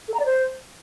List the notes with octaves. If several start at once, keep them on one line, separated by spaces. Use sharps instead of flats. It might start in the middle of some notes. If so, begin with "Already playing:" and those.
A4
A#5
D5
C5